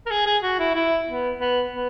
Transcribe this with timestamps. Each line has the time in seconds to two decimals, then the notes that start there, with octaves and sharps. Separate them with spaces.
0.06 A#4
0.11 G#4
0.26 G#4
0.43 F#4
0.59 E4
0.75 E4
1.08 B3
1.40 B3
1.72 B3